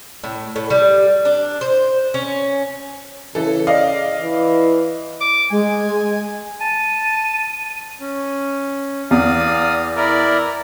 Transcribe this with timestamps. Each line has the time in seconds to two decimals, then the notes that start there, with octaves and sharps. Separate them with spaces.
0.24 A2
0.56 A2
0.70 G3
1.25 D4
1.61 C5
2.14 C#4
3.35 C#3 E3 A4
3.67 D5 D#5 F5
4.20 E3
5.21 D6
5.51 G#3 G#5
6.60 A5 D#7
8.00 C#4
9.11 E2 D5 F5 D#6
9.96 E4 A#4 D5